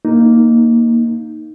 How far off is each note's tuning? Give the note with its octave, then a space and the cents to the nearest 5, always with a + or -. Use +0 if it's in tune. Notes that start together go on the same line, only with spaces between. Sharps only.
A#3 +0 D#4 +0